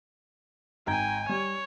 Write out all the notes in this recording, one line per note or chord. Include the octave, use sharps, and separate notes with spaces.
G#1 G5 G#5 A#5 G#6
G3 C#5